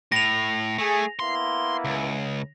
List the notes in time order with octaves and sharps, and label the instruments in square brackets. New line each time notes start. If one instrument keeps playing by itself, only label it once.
[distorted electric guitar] A2 [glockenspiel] A#6 F7
[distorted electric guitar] A3 [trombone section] G#4
[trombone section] A#3 B3 E4 [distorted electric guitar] C6
[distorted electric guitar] C#2